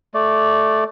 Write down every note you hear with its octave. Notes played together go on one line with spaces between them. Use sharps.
A3 D5